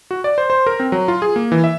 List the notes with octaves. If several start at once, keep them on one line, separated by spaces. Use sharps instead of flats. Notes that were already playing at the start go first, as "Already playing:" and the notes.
F#4
D5
C5
C5
A#4
C4
F#3
F4
G#4
A#3
E3
E5